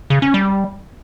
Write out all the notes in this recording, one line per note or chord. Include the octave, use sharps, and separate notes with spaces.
C#3
C#4
G3